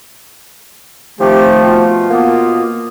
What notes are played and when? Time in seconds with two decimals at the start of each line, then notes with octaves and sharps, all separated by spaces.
1.20 D#3 F3 A3 C4 G4
1.64 B2 F4
2.11 A#3 B3